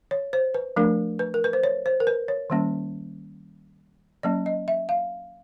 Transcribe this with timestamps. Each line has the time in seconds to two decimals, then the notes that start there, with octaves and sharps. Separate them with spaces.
0.11 C#5
0.33 C5
0.54 B4
0.76 F3 A3 D4 A#4
1.19 B4
1.34 A#4
1.44 B4
1.53 C5
1.63 C#5
1.86 C5
2.00 A#4
2.07 B4
2.28 C#5
2.50 D#3 G3 A#3 C#4
4.23 F#3 A#3 C#4 D5
4.46 D#5
4.68 E5
4.89 F5